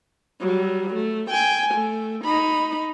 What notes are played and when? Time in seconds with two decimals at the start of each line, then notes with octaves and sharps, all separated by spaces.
0.40 F#3 G3
0.94 A3
1.30 G5 G#5
1.74 A3
2.24 D#4 B5